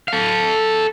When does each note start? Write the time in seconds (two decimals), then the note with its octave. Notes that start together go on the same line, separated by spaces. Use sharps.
0.08 A4 F5